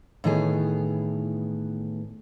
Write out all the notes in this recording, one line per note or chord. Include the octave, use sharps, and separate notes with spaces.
A2 D#3 E3 B3 G#4 C#5